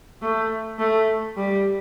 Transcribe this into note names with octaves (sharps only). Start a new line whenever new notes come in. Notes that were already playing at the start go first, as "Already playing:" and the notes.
A3
A3
G3